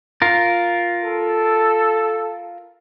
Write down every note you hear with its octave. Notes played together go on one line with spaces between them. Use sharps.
F4 A#4
A4